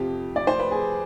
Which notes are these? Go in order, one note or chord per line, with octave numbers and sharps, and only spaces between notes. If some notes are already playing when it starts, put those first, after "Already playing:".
Already playing: F2 C3 F3 G4
D5
C5
B4
G#4